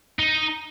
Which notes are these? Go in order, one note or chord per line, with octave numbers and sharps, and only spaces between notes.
D#4